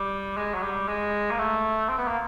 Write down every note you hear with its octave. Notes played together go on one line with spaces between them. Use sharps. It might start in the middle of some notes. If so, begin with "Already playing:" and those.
Already playing: G3
G#3
F#3
G3
G#3
A#3
A3
C4
B3
A#3